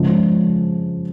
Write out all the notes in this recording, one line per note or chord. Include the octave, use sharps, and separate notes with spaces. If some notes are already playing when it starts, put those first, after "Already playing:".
Already playing: C#3 F3 G#3 C#4